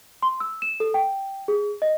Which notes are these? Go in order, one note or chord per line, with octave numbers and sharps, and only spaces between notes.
C6
E6
E7
A4
G5
G#4
D#5